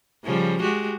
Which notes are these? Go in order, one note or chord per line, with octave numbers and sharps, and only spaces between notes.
C#3 F3 G3
G#3 F#4 G4